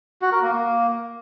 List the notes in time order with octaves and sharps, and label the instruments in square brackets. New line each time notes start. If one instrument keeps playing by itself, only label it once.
[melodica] F#4
A#4
A#3
A#3